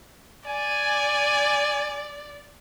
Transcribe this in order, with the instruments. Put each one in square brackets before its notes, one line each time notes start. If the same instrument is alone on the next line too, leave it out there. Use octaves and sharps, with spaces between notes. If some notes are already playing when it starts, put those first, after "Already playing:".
[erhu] D5 [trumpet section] G#5